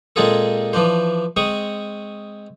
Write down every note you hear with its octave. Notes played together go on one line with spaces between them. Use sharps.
A#2 G#3 C4 F4 G#4 A4
E3 F3 D4 C5
G#3 C4 C#6 D#6